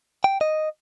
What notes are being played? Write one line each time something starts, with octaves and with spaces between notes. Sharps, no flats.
G5
D#5